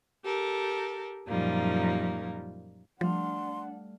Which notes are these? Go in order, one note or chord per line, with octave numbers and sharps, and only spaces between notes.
G4 A4 A#4
F#2 A#2 F3 G3 A#3 D#4
F3 G3 A3 D4 F5 F#5 C6